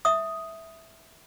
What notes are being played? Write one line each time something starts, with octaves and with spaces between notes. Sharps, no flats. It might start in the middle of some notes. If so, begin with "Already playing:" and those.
E5 D#6